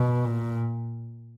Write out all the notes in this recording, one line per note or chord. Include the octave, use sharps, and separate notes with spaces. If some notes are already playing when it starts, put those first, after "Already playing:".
Already playing: B2
A#2